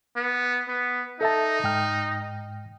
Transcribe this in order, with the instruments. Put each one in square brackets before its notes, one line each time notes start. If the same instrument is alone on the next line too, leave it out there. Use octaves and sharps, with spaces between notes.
[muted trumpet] B3
B3
[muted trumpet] D#4 [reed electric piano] A4 E5 A5
[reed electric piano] G#2 G5 F6